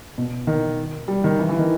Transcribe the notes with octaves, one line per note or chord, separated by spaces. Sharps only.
B2
D#3
G3
D#3
E3
E3
D#3